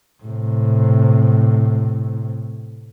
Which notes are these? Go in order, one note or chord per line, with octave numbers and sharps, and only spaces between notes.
A2 C3